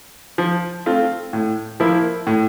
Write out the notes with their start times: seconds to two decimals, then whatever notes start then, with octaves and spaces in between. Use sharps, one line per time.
0.38 F3
0.86 A3 C4 F4
1.33 A2
1.80 F3 A#3 E4
2.27 A2